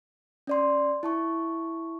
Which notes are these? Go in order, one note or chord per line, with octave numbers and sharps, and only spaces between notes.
C#4 D5 C6
E4 A5 C#6